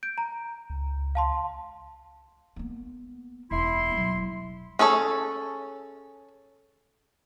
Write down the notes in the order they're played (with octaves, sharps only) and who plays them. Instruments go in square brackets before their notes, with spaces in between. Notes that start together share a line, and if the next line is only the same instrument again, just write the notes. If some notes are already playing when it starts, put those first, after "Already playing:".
[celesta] G6 D7
A#5
[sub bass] C#2
[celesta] F5 A5 C6
[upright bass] A#3 B3
[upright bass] E1 D2 [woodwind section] E4 C6
[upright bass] B2 F#3
[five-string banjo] C#4 G#4 A4 C#5